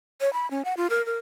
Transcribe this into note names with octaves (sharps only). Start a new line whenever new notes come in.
C#5
B5
C#4
F#5
F4
A#4
A#4